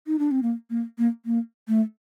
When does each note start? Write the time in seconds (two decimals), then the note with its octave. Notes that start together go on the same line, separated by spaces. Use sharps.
0.07 D#4
0.19 D4
0.31 C4
0.42 A#3
0.70 A#3
0.98 A#3
1.26 A#3
1.68 A3